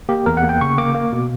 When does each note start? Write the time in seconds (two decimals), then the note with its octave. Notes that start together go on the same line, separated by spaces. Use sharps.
0.09 A#3 G4
0.26 E2 A#4
0.37 F#5
0.43 A#3
0.49 G5
0.61 C#3 C#6
0.78 A#3 D6
0.95 A#3
1.12 B2